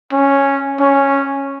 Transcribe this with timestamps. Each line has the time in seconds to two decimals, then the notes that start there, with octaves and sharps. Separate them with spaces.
0.13 C#4
0.80 C#4